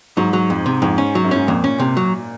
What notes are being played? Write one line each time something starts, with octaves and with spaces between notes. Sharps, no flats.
G#2 F#3
F#3
F2
C3
F2 G#2
C#4
F#3
F#2
G#2 C#4
F2 A#2
C#4
C3
F#3